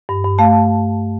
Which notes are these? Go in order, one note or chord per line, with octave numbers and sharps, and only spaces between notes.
G2
G2
A3 F5 A5